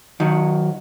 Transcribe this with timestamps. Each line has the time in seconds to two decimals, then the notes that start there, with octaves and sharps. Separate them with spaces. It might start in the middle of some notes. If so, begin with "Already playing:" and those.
0.20 D#3 F#3